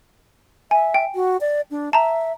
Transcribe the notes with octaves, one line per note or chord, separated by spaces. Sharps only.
E5 G#5
G5
F#4
D5
D4
E5 A5 A#5